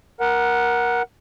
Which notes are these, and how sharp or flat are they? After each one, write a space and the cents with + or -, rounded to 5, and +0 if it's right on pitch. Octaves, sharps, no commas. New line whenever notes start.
A#4 +15 F#5 +0